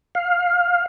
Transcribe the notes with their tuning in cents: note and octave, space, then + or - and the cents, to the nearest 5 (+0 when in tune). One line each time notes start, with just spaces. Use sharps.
F5 +15